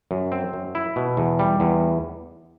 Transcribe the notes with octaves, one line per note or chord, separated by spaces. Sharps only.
F#2
C4
F#2
E4
B2
E2
G3
E2